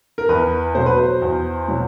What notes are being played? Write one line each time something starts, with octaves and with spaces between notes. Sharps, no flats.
A#4
E2 B4
B2 F#3 C5
B4
C5
E2
B2 F#3